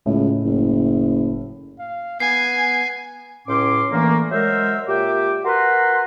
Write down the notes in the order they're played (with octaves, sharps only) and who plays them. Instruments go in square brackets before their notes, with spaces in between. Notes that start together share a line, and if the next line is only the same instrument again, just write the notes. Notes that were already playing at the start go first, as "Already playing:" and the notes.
[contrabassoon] C#2 [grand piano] A2
[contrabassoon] F#1
[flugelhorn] F5
[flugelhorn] B3 [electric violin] G#5 [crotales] C7
[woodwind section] C#2 A2 C#4 C6 D6
D3 E3 A3 A#3
F#3 G#3 A#4 C5 E5
A#2 G4 E5 G5 D6
F#4 A#4 B4 A#5 C6